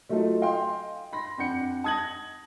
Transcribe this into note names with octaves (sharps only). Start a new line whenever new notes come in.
F#3 A3 D#4 F4 A4
D#5 F5 G5 G#5 C6
B5 C6 A#6
F2 D4 F#5 G6 C#7
A5 D#6 G#6 A#6 F#7